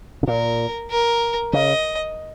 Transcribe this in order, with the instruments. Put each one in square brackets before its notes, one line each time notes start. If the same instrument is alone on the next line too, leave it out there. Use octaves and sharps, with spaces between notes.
[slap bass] C#3
[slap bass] A#2 [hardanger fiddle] A#4
[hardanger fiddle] A#4
[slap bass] C#3 [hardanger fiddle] D#5